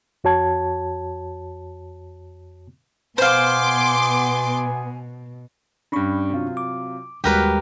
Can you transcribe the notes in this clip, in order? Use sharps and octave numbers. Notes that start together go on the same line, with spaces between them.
F2 F#4 C#5 A5 G#6
B2 B3 C5 F5 G#5 C6 D6
G2 C#4 D4 B5 C#6
C3 F#3 F4
D6
D#2 G3 G#3 F#4 G4 A#4 B4